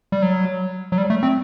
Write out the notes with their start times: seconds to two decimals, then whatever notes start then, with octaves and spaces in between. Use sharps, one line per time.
0.12 G3
0.22 F#3
0.92 F#3
0.98 G3
1.10 A3
1.23 C4